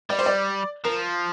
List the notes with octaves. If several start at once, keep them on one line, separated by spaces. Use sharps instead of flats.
G3 D5
C5
D5
F3 A#4